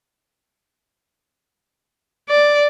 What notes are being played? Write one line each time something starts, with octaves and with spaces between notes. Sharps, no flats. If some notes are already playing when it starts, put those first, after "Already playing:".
D5